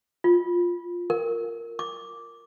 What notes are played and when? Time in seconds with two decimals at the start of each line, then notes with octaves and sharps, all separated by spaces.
0.24 F4
1.10 A#4
1.79 D6